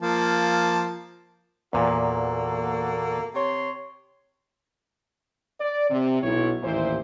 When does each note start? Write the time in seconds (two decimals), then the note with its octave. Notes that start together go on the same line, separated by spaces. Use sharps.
0.02 F3 A#3 A5
1.73 E2 A#2 A#3 F#4 A4
3.35 C3 C#5 C6
5.60 D5
5.90 C3
6.22 B1 E4 C#5
6.62 A1 D#2 A#2 E4 C5